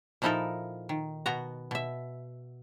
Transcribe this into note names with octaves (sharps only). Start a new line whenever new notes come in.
A#2 F3 D#4 E4 A4 A#4
D#3
B2 B3 F#4 A#5
B2 E5